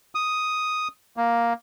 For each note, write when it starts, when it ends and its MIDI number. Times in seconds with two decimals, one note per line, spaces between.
0.15 0.88 87
1.17 1.53 58